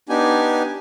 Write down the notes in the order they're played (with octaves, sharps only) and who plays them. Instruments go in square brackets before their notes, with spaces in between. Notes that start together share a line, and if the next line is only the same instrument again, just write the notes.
[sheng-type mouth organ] B3 D4 D#4 G4 G#5